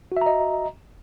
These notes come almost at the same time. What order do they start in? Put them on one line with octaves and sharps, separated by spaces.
F#4 E5 A#5 D#5